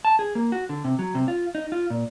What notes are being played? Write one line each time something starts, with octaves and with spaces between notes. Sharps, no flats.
A5
G#4
A#3
F#4
D3
C3
F#3
C3
F4
D#4
F4
A#2